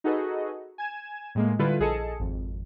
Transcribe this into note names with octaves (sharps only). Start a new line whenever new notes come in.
D#4 F#4 G#4 A4 B4 D#5
G#5 G#6 E7
A2 G#3 A#3
D3 G3 E4 F4 A4 B4
A#1 G#4 A4 D#5 A5 C#7
G#1 F2